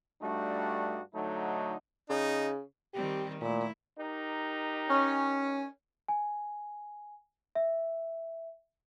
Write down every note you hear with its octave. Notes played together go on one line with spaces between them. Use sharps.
G2 G3 A3 D4 D#4 F#4
D3 F#3 A3 D#4
C#3 D#4
D#3 G3 C4 G4
A#2 A3 E4
D#4 G4 A#4
C#4
G#5
E5